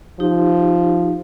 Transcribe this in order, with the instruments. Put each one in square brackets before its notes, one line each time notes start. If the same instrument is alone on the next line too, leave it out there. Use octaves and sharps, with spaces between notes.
[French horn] F3 [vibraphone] D#4 G4